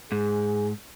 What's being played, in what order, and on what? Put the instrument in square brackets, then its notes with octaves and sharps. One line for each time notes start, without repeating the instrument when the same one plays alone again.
[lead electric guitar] G#2 [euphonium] G#4